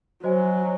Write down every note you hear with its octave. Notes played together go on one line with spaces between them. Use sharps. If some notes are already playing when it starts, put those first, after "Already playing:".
F#3 F#4 C5 D#5 G#5